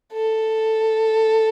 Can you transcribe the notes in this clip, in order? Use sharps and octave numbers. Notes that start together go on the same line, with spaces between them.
A4